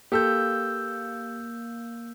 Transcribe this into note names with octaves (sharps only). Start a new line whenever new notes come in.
A#3 G4 A4 E6 G6